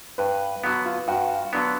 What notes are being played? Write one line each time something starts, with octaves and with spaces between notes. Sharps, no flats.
G2 B4
D3 F#3 B3 F#4
F4
G2 F#4
D3 F#3 B3 D4